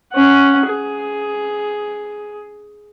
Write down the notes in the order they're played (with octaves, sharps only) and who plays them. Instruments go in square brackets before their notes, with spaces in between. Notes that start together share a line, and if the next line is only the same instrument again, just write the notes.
[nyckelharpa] C#4 F#5
G#4